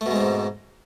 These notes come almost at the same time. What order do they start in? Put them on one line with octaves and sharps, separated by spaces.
A3 B2 G#3 C4 G#2